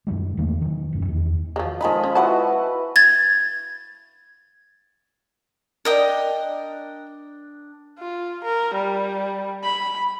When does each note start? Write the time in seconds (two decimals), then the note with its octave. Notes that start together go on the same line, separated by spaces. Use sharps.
0.07 F#2 D#3 F#3 G#3
0.37 E2 D#3 A3 A#3
0.61 D#3 F#3
0.93 E1 F#2
1.05 E2 D#3
1.56 F3 F#3 G#3
1.81 D#3 F3 G#3 D#4 B5
2.04 C#4
2.15 E4 F#4 B4 F#5 A5
2.96 G#6 A6
5.85 D4 A#4 D#5 G5
7.99 F4
8.44 A#4
8.74 G3
9.64 B5